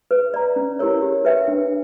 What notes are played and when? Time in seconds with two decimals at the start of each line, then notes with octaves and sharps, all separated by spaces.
0.11 B4
0.34 D5 A#5
0.56 C#4
0.79 E4 G4 A#4 C#5
1.02 G4
1.25 B4 E5 G5
1.48 D4